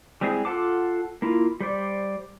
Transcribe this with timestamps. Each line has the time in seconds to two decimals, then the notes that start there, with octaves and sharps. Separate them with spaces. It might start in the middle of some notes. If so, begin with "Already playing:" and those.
0.21 G3 G#3 C4 E4 G#4
0.45 F4 A4 F#5 A5 D6
1.22 A#3 E4 F4
1.61 G3 C5 D5